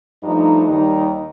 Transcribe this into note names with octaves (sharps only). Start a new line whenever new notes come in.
G2 F3 A3 D#4
D#2 D#3 G3 D#4